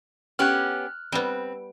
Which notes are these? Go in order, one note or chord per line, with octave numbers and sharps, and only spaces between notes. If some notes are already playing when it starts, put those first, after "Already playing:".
B3 C#4 G4 F6 F#6
G3 B3 C4